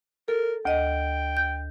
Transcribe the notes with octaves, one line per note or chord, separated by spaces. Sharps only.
A4 A#4
D2 D#5 G5
G6